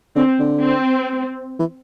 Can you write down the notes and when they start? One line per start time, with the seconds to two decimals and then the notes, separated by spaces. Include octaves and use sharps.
0.16 D3 C4
0.39 D3
0.63 C4
1.59 E3